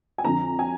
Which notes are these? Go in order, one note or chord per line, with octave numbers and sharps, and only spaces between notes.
G#5
F2 D3 A#5
G#5